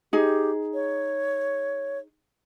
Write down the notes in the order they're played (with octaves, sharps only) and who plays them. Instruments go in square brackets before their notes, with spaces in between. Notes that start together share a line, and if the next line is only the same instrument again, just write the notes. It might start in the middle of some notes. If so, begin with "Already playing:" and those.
[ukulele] D#4 G#4 [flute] G4
[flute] C#5